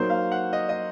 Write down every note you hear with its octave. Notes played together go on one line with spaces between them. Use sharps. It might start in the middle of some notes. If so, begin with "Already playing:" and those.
Already playing: F#3 A#3 D#4 C5
F5
F#5
D#5
D#5